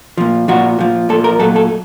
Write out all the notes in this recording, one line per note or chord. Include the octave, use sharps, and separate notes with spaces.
A#2 F3
A#2 F3 F#4
A#2 F3
A#2 F3 A4
A#4
A#2 F#3 A4
A4